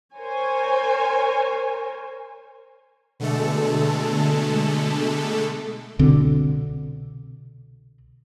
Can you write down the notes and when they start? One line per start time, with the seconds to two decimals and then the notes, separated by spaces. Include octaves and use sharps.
0.18 A#4 C5 C#5 G#5
3.20 B2 D3 G#3 A3 A4
5.99 C2 B2 D3 C4